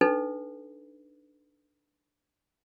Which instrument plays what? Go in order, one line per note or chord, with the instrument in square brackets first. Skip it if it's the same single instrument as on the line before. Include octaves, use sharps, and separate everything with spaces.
[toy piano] D4 D#4 A4 B4